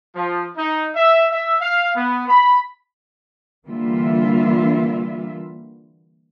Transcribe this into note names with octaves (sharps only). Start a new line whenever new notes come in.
F3
D#4
E5
E5
F5
B3
B5
D3 E3 G3 A#3 F4 E5